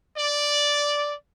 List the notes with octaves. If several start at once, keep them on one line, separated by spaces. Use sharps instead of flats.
D5